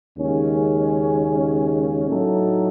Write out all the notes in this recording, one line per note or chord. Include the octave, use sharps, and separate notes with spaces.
D#2 C#3 G#3 C#4
A2 F#3 A3 D#4 A4